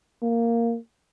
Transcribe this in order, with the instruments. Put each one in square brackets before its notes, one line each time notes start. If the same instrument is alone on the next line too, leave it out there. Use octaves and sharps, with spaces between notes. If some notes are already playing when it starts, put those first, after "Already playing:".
[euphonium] A#3